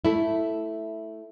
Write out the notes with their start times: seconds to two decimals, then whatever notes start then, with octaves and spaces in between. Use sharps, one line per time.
0.05 A3 E4